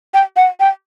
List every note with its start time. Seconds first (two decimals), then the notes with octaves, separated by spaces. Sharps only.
0.14 G5
0.36 F#5
0.60 G5